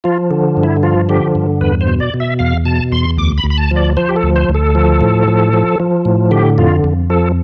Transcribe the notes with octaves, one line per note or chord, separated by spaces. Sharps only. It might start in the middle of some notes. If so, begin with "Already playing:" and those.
F3 F4
D3
G2
E4
F3 F4
D3 G4
G2
E2 B4
C5
B2
D5
B2
E5
E2 F5
B2 A5
E2 C6
D2 D6
B5
D2
B5
A5
F3
D5
F3 C5
G4
A4
D2
C5
D2
A4
F3
A2
F3
F3
F3
A2
D3 G4
F2 F4
F2
F3 A4